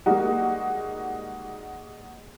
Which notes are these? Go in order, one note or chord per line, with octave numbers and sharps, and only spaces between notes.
G3 G#3 A#3 D#4 F#4